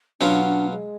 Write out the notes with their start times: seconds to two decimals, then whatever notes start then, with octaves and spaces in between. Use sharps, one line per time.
0.20 B2 F#3 C#4 D4 F4
0.45 D4
0.70 G#3